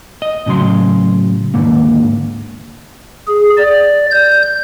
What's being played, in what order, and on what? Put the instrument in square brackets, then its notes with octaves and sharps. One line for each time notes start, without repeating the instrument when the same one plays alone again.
[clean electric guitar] D#5
A2 C#3 F#3 C6
D#2 G#2 D3 A#3
[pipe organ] G#4
D5
G6